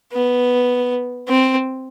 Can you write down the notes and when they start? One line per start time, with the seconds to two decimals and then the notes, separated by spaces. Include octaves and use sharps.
0.13 B3
1.28 C4